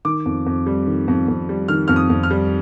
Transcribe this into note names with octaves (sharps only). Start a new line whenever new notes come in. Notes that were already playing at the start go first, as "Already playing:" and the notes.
D#3 D6
F2
F2
G3
D#3
F2
F2
G3
D#3 F6
F2 F6
D#6
F2
F6
G3